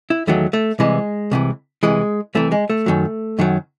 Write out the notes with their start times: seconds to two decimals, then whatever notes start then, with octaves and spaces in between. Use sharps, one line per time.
0.10 E4
0.27 E2 D#3 F#3 A3
0.53 A3
0.79 C2 C3 E3 G#3
1.31 C2 C3 E3
1.83 C2 C3 E3 G#3
2.35 C2 C3 E3 A3
2.52 G#3
2.70 A3
2.86 F#2 D#3 F#3
3.39 F#2 D#3 F#3